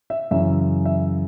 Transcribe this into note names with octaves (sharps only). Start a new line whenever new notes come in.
E5
F#2 C#3 E3 E5
E5